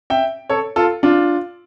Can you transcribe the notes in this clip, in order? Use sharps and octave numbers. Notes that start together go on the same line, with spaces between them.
E5 G5
A4 C#5
F4 A4
D4 F4